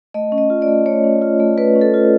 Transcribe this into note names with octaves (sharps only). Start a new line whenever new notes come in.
A3 D#5
C#4
D#5
F4
D5
A3
A3 C#5
C#4
F4
A3
A3 B4
C#4
A4
F4